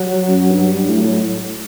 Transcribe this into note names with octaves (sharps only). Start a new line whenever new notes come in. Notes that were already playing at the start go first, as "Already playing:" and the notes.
Already playing: F#3
F#2
G2
G3
A2
F#3
A2